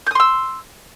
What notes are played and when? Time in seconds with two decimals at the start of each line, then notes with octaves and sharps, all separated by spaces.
0.07 G6
0.11 D#6
0.15 C6
0.20 E6